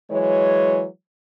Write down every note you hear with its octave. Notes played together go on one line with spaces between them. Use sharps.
E3 F#3 G#3 C#5